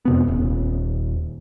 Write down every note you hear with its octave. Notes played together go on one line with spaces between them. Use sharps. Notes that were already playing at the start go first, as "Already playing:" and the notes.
F2 C3 B3
D#1